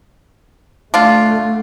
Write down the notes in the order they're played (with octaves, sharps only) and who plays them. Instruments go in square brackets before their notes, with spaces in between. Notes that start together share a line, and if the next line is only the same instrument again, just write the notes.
[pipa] D3 F4 [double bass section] A3